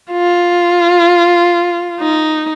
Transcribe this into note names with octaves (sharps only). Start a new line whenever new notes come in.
F4
D#4